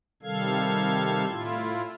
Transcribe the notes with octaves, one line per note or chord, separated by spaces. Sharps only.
C3 D#3 G3 A4 F5 G#6
A2 E4 F4